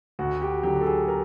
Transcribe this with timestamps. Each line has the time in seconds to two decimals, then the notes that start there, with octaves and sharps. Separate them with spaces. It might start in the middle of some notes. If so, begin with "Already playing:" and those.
0.19 D2 F#4
0.42 G4
0.63 D3 F#3 G4
0.81 A4
0.86 G#4
1.08 A#4